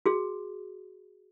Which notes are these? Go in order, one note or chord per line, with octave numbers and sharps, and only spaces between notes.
F#4 G#4